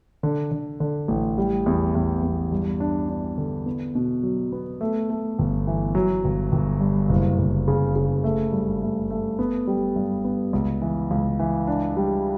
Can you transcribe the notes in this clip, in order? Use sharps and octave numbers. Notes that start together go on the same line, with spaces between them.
D3
D3
D3
A1
G3
E2
E2
E2
G2
D4
D4
D3
B3
B2
F#3
B3
A3
A3
G1
E3
F#3
G1
G1
G2
F#1
F#1
C#3
C#3
A3
G2
A3
A3
B3
G3
G2
B3
C#2
E3
C#2
E3
D4
G3